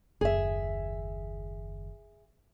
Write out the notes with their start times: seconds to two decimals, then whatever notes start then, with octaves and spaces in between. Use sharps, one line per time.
0.21 F#1 D#2 G#4 E5